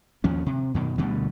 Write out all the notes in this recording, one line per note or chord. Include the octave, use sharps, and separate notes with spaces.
D#2 F3 C#4
C3
F#2 B2 D#3
D2 B2 D3 G3